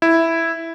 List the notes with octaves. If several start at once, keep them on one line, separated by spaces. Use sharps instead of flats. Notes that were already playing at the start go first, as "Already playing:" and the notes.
E4